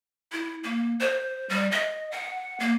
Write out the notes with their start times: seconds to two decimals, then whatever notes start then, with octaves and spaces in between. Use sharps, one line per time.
0.32 E4
0.64 A#3
1.00 C5
1.49 G3
1.72 D#5
2.12 F#5
2.60 A#3